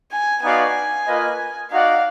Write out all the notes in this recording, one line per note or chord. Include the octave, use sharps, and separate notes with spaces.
G#5
B3 D#4 F#4 D5 F5 G#5
A#3 F4 B4 D#5
D#4 F#4 D5 F5 F#5